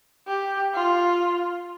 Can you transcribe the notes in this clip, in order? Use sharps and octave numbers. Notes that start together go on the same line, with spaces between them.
G4
F4